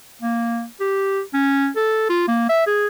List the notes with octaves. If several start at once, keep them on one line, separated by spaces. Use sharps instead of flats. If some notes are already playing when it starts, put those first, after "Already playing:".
A#3
G4
C#4
A4
F4
A#3
E5
G#4